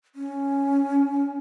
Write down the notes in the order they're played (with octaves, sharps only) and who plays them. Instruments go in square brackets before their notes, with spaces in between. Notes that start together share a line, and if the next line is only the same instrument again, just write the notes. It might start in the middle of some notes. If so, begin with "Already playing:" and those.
[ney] C#4